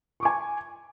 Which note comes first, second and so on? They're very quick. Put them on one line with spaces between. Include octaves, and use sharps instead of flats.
C#6 D6 G#5